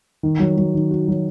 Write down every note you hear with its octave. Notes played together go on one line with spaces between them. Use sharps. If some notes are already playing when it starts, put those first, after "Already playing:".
D#3
F#3
F#3
D#3
F#4
F#3